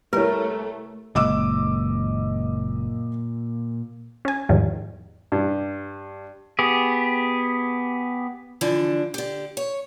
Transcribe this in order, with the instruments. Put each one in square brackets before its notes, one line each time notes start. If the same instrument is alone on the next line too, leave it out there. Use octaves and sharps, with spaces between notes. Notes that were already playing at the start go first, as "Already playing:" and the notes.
[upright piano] C2 E4 [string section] A3 [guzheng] A#4 [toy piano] B4 C#5
[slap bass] F#1 G#3 [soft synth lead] A#2 [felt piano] D#5 D6 E6
[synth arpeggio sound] C#4 G#5
E2 G#2 D#3 F3 G3
[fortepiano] G2
[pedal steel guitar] B3 G4 G#4
[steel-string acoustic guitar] D3 E3 F3 D4
D3 G4
C#5